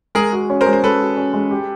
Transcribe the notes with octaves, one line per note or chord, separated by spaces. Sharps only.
G#3 G#4 A#4
F#4
C#4
A#4 C5
G#3
C5
G#3 A4 B4
F#4
C#4
G#3
G4